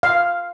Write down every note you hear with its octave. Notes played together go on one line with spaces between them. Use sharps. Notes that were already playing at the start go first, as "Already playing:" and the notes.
F5